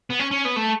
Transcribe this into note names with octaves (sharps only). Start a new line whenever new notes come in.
B3
C#4
C#4
B3
A3